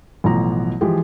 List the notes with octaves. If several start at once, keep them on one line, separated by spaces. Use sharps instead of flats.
A1 B2 F3 F#3 A#5
E3 F3 G#3 G4 G#4